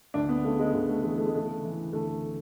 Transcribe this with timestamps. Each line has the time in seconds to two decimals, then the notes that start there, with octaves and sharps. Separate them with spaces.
0.14 D2 D4
0.29 B3
0.44 C#3 A3
0.59 G#3
0.73 D2 G#3
0.89 A3
1.03 E3 G#3
1.18 A3
1.26 G#3
1.33 C#3 A3
1.63 E3
1.93 D2 A3